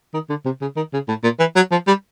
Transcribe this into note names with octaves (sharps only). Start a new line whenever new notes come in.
D#3
D3
C3
C#3
D#3
C#3
A2
A#2
E3
F#3
F3
G3